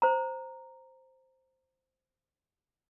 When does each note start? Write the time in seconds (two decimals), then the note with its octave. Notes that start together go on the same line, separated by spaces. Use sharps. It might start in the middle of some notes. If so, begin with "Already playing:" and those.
0.02 C5 A#5